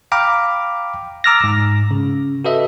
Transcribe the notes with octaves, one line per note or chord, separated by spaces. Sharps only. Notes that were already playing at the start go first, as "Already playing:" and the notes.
F5 G5 A#5 B5 D6 F6
A#5 D6 E6 F6 A6 A#6
G#2
C#3
F#4 A4 B4 D#5 E5